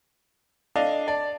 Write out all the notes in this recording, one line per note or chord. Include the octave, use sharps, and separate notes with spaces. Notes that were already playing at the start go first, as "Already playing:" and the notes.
D4 A4 D#5 F5
D5 A5